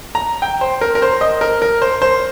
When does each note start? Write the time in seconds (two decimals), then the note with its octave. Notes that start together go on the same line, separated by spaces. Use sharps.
0.15 A#5
0.42 G5
0.61 C5
0.81 A#4
0.95 A#4
1.02 C5
1.21 D#5
1.41 A#4
1.62 A#4
1.82 C5
2.02 C5